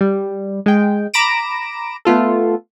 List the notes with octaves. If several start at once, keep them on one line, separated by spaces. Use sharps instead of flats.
G3
G#3 G5
A#5 B5 D6 A#6 D7 E7
A3 B3 F4 A4